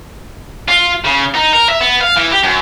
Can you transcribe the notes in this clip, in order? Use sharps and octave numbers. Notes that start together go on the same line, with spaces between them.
F4
C#3
D#4
A#4
E5
B3
F5
E3
G4
F#2